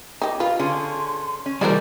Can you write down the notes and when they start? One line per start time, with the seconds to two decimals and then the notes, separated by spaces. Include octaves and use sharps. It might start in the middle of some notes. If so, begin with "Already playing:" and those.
0.21 D#4 G4 D#5
0.40 F4 B4 F5
0.59 D3 C#4 G#4 C6
1.46 C#4
1.61 E3 G3 G#3 F#4 A#4 C5 D5